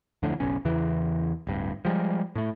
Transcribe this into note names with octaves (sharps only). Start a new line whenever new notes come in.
D1 F2 A2 D3
F#1 B1 C#4
E2 C#3 E3
D1 G2
F3 G3 G#3
A2 A3